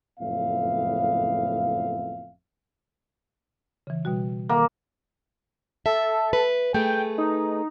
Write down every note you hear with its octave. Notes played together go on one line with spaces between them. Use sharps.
F#1 F2 A2 B3 E5 F5
C#3 E3
B2 G3 F#4
D#3 A#3
A4 E5
B4
A3 G#4 B4 G5
D#4